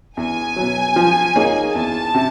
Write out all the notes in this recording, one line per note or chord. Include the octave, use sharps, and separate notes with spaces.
E2 G#5
B2 F#3
F3
A#3 D#4 G#4 C#5
E2 A5
C3